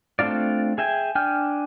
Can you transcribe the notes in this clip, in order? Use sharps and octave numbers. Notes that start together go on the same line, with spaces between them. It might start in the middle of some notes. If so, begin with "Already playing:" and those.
A3 C4 D4 F4 D5
G#4 E5 G5 G#5
D4 G5 G#5 F6 G6